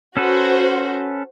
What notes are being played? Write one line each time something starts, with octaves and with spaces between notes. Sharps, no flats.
C#4 F#4 A4 B4 C5